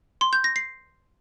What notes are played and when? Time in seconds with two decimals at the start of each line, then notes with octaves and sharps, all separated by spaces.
0.21 C6
0.33 G6
0.44 A#6
0.56 C7